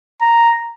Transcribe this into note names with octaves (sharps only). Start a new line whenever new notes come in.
A#5